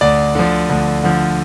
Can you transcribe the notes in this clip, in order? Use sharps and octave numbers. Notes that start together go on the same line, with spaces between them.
D2 D5
D3 F3
D2
D3 F3